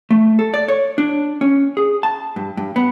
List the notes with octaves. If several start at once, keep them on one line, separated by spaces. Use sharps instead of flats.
A3
A4
D5
C#5
D4
C#4
G#4
A5
G2
G2
B3